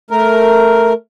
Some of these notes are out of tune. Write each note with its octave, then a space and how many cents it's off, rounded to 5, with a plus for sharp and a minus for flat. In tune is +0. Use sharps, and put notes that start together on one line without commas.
A3 +0 A#4 +0